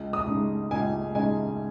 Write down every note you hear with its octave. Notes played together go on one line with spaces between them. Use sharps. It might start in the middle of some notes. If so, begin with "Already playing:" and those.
Already playing: C#2
D#6
C#3 G#3 D#4
C#2 G#5
C#3 G#3 D#4 G#5